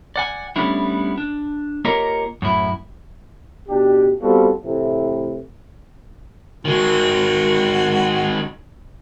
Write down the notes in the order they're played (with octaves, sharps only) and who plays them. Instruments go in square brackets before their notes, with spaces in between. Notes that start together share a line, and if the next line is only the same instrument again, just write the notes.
[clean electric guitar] D5 F#5 G#5
G3 A3 B3 C#4 D4 E4
D4
A#3 F4 G4 A#4 C#5 D#5
F#2 A2 E4
[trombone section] A1 B2 D4 G4
G3 B3 C4 F4 F#4 A4
A2 C3 E3
[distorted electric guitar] D#3 G#3 [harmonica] F#4